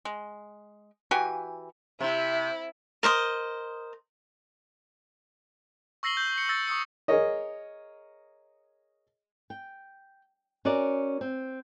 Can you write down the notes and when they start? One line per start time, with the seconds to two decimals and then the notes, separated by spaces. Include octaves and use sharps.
0.05 G#3
1.11 E3 F#4 G4 G#5
2.00 C3 E4
3.03 A#4 C5 D#5 D#6
6.03 C#6 E6 A#6 C7 F#7 G7
6.17 G6
6.38 C#7
6.49 E6 A6 A#6
6.67 C#6 D#6 E6 C#7
7.08 G#4 A#4 C#5 D#5
9.50 G5
10.65 C#4 F#4 A#4 D5
11.21 C4